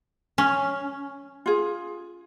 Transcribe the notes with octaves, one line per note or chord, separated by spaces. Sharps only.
C#4
F4 G#4